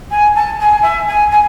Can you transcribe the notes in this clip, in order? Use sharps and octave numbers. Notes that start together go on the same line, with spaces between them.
G#5
A5
G#5
E5
G#5
G#5